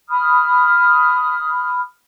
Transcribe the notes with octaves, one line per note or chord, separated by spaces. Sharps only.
B5 D#6 F6